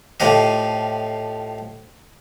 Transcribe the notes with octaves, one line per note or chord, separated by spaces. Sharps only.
A2 F3 G4 D#5